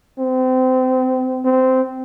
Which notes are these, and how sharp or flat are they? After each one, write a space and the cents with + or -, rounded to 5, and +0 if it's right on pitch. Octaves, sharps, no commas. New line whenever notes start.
C4 -30
C4 -15